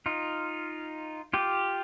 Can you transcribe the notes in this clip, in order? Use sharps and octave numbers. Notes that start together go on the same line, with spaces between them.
D#4 F4
F4 G4